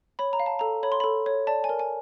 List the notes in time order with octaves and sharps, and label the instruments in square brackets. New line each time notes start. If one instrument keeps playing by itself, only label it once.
[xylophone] C#5 B5
A#5
F5
A5
A4 A#5
C#5 B5
C6
A4 B5
C#5
D5 A5
G#5
A#4
G#5